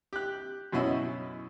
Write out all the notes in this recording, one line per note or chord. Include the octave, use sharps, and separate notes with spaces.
G4 F#6
F#2 B2 C#4 E4 D#5